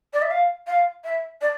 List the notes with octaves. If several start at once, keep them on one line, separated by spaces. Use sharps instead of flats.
D5
E5
F5
F5
E5
D5